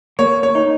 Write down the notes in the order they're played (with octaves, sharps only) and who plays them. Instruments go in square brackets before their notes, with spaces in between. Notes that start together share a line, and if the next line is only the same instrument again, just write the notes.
[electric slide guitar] A#3 [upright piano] C#5
[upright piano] C#5
[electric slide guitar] D#4